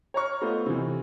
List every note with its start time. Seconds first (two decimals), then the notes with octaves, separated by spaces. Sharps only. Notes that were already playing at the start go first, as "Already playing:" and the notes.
0.14 C#5 A#5 C#6 F6
0.41 A3 B3 F4 C5 D#5
0.66 C3 E3